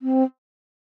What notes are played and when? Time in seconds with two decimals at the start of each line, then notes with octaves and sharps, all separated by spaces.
0.02 C4